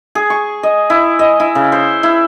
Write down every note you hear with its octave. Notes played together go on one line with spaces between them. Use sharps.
G#4
C#6
D#5
E4
D#5
E4
C#3
C5
E4